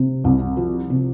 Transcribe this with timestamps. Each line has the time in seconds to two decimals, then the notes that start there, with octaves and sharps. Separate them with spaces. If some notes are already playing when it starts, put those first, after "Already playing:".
Already playing: C3
0.24 C2
0.57 F3
0.90 C3